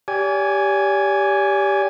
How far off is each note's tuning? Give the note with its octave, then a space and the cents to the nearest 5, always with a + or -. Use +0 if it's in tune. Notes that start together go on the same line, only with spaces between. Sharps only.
G4 +0 D5 -40 G#5 +0